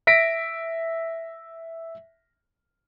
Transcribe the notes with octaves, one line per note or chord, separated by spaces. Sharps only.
E5 A#6 B6 D7